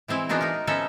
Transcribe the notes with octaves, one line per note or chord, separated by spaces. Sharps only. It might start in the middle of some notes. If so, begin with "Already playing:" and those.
E3 G#3 C4 E4
E3 G#3 B3 D4 D#4 F#4
D#4 A#4
F3 B3 C#4 D#4 A4 E5